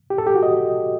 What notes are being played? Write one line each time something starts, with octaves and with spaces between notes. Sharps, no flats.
G4
A2 A4
G4
F#4
D#5